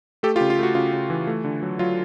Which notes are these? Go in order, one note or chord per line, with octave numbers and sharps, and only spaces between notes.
A3 G4 A4
F4 G4
C#3
F4
A3 F#4
C#3 F4
C#3
E3
A3
D3
F#3
F#3 F4